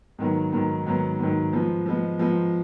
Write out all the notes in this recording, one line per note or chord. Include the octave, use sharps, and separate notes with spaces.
G#2 D#3 F#3 B3
G#2 D#3 F#3 B3
G#2 D#3 F#3 B3
G#2 D#3 F#3 B3
F3 G#3 B3
F3 G#3 B3
F3 G#3 B3